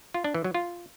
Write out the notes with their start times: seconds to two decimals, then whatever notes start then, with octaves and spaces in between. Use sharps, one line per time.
0.14 F4
0.24 D4
0.34 E3
0.44 F#3
0.54 F4